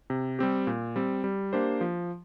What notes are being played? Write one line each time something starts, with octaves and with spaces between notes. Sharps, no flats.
C3
G3 C4 G4
A#2
G3 C4
G3
A#3 D4 G4 C5
F3